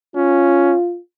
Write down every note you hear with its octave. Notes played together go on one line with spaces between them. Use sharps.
C#4 F4